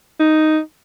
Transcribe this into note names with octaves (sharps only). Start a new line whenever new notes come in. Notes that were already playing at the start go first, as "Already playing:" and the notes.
D#4